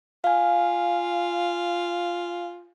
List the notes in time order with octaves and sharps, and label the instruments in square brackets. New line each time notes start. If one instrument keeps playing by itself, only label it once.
[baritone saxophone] F4 [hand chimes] F5 G#5